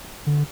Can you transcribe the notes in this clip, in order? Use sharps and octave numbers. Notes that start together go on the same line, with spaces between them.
D3